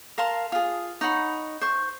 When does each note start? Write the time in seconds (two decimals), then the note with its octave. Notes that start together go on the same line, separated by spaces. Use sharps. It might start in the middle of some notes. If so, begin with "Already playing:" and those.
0.18 A#4 F5 A5 C6
0.52 F4 G#4
1.01 D#4 C#5 F#5 B5
1.61 C5 C#6